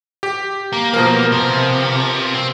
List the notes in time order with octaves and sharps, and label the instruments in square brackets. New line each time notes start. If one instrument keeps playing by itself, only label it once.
[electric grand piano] G4
[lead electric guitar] A#3
[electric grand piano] B2 F3 A#4
[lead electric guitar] C3
C4